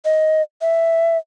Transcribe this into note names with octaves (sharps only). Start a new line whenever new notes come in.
D#5
E5